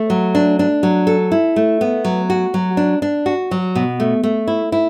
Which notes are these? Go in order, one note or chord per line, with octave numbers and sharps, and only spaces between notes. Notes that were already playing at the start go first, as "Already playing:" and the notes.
Already playing: A3
F#3
D4
D4
F#3
A4
E4
A3
B3
F#3
F#4
F#3
D4
D4
F#4
F#3
B2
A3
A3
E4
E4